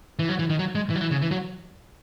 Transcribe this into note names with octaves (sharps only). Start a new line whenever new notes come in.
E3
F#3
E3
D#3
F#3
G#3
E3
F#3
E3
C#3
E3
F#3